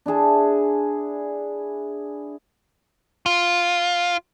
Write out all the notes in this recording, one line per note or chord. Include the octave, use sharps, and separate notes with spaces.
D4 E4 G#4 A5
F4